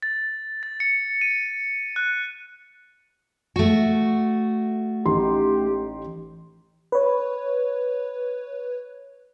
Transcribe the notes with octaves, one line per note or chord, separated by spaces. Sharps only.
A6
A6
C#7
D#7
F#6
A3 F#4
A1 D#4 G4 C6
B4 C#5